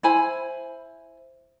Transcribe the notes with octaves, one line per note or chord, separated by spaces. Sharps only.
E4 C5 G#5 B5